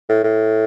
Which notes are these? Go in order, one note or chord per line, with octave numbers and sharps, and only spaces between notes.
A2
A2